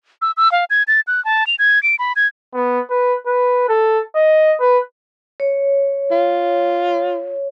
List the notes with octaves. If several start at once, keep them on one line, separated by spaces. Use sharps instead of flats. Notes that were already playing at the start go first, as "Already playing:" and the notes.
E6
E6
F5
G#6
A6
F#6
A5
F7
G#6
D7
B5
G#6
B3
B4
B4
A4
D#5
B4
C#5
F4